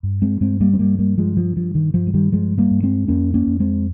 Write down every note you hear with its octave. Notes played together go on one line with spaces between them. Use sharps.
G2
G#3 C4
G2 G#3 C4
G3 A#3
C4
G2 G3 A#3
G3 A#3
G2 F3 G#3
F3
G2 F3
D#3
G2 F3
G#3
D#3 G3
G2 F3 G#3
G3 A#3
G2
G#3 C4
F2 A#3 C#4
A#3 C#4
F2
G#3 C4